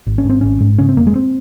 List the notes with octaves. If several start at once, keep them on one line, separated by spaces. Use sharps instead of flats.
G#1
C#4
G#2
C4
G#1 C#4
G#2
C#3 C#4
C4
F1 A#3
G#3
C4